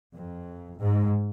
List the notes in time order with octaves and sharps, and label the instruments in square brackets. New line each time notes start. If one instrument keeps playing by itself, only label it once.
[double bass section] F2
G#2